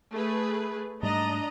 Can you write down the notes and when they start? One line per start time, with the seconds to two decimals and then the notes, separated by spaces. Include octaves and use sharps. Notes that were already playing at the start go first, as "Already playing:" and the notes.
0.12 A3 G#4 B4
1.03 G#2 G3 A3 D4 D#5 A#5